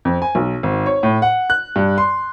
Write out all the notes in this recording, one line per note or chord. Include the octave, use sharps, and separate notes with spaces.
F2
G#5
B1
G#1
C#5
A2
F#5
F#6
G2
C6